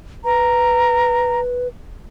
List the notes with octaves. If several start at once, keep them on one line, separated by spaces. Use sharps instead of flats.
B4 A#5